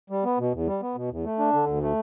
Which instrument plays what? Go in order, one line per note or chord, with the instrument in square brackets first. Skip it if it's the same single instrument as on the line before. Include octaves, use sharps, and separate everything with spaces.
[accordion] G3
B3
B2
E2
G3
B3
B2
E2
A3
D4
D3
D2
A3